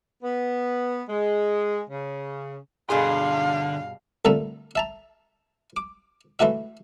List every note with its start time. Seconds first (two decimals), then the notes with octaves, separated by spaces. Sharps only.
0.23 B3
1.09 G#3
1.89 C#3
2.90 G2 B2 D3 G#4 F5 C6
4.25 C2 A#2 D3 A3 E5 A#5
4.75 E5 A5 A#5
5.77 D6
6.39 E3 G#3 A3 F#4 E5